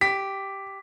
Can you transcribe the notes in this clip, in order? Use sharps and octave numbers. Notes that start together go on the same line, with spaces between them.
G4 B6